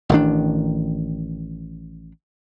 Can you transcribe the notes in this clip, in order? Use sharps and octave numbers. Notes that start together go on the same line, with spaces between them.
A1 D#3 D4